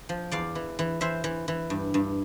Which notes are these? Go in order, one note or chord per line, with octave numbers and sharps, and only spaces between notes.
F3
E2 D5 F5
E3
E3
E3 C5 E5
E3
E3
G2
G2